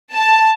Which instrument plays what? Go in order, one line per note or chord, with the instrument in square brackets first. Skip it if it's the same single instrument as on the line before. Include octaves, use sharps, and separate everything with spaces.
[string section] A5